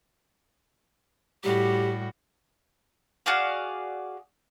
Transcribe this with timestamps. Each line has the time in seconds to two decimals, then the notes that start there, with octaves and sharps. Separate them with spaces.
1.44 A2 G3 F#4 G4
3.26 F#4 G#4 D5 F5